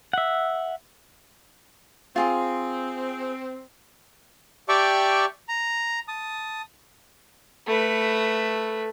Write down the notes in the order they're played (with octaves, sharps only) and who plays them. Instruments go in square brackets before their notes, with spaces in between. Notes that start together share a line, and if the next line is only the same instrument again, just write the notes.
[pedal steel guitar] E5 F#5
[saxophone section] C4 [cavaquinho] F4 G#4 C6
[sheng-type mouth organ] G4 D5 E5 G5 A5 C#6
A#5
A5 D#6
[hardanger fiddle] A3 B4